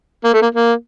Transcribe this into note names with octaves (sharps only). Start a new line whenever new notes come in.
A#3
A3
A#3
A#3